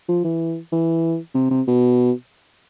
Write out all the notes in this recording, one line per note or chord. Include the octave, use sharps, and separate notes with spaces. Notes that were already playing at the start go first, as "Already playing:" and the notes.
F3
E3
E3
C3
C3
B2